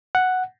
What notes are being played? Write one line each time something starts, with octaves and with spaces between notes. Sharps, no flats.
F#5